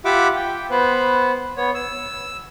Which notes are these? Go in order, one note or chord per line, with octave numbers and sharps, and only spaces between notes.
F4 G4 E5 F#5 B5 D6
G5
B3 B4 C5
B3 C#5
E6